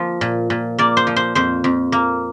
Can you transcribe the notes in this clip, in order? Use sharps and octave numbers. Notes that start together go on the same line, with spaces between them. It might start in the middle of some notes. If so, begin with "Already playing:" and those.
Already playing: F3 A#3
A#2
A#2
A#3 D5
C5
F3
C5
F2 C5
F2
A#3